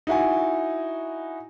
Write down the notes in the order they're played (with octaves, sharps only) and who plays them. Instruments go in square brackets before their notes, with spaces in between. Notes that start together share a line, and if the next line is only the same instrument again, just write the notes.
[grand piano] D#4 E4 F#4 G#5